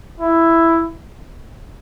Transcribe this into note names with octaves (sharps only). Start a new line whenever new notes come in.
E4